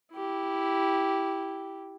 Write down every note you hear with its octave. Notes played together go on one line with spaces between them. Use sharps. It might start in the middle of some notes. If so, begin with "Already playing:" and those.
E4 G4